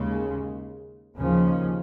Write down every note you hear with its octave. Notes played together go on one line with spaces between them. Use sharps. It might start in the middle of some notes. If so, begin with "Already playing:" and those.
Already playing: D#2 C#3 G#3
D#2 C#3 F3 C#4